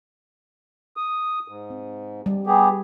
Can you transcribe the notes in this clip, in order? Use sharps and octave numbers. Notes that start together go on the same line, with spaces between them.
D#6
G#2
C4
G3
B3 G4 G#4